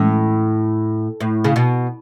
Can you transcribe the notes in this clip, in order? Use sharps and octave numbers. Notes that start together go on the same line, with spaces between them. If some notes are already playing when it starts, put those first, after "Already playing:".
Already playing: A2 E3 G#3 C#4
A2
C#3
B2